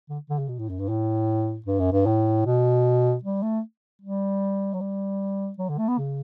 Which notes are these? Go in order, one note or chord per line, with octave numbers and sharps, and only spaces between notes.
D3
D3
C#3
B2
A2
F#2
G2
A2
G2
F#2
G2
A2
B2
G3
A3
G3
F#3
G3
F#3
D3
A3
B3
C#3